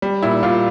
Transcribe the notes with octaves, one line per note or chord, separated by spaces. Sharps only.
G3
A#2 E4
A#2 F4